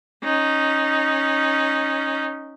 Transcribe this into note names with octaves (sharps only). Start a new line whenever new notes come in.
C#4 D#4